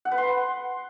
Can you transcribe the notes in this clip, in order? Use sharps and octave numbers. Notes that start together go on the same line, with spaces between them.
F#5
B4
C6